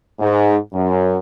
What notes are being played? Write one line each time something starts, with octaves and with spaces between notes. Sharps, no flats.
G#2
F#2